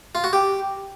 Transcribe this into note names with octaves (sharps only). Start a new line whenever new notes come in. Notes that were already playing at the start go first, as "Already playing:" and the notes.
F4
F#4
G4